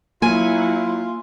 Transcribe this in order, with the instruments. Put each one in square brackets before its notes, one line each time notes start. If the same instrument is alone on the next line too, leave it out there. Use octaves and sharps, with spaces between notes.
[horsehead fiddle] F#3 E4 [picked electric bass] A#3 [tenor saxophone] F4 [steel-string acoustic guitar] G#5